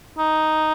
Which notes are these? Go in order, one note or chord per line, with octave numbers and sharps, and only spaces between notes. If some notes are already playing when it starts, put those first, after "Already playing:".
D#4